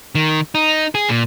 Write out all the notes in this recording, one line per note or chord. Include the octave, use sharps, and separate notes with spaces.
D#3
D#4
G#4
A#2